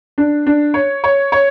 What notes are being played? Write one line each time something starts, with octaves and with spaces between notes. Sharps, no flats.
D4
D4
C#5
C#5
C#5